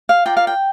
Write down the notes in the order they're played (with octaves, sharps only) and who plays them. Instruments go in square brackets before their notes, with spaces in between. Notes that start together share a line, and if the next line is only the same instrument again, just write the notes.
[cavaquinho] F5
F4 A#4 D5 G5
F5
G5